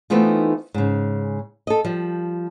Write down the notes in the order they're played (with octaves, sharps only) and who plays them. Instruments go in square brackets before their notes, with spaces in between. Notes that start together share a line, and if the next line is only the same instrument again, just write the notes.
[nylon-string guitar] E3 A3 B3 C4 D#4 F4
G#2 C#3
A4 D#5
F3 G3